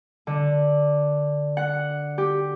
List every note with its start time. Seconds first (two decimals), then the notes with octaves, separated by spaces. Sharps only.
0.27 D3
1.57 F#5
2.18 G4